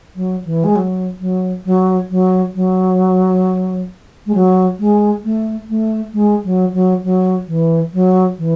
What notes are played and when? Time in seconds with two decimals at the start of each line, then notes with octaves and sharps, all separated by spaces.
0.16 F#3
0.45 E3
0.64 G#3
0.76 F#3
1.20 F#3
1.65 F#3
2.10 F#3
2.55 F#3
4.26 G#3
4.35 F#3
4.79 G#3
5.24 A3
5.69 A3
6.13 G#3
6.44 F#3
6.73 F#3
7.04 F#3
7.48 E3
7.93 F#3
8.38 E3